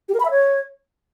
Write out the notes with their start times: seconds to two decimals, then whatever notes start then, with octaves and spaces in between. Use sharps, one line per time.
0.09 G4
0.14 A#4
0.20 B5
0.25 E5
0.31 C#5